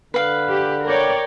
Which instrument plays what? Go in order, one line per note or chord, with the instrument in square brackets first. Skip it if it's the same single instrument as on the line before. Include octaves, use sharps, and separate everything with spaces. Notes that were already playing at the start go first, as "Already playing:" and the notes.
[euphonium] D3 [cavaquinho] B4 F5
[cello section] G4
[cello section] A#4 [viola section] C#5 D5 G5